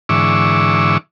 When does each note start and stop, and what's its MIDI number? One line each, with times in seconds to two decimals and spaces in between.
0.09 0.98 44
0.09 0.98 50
0.09 0.98 52
0.09 0.98 85
0.09 0.98 86
0.09 0.98 88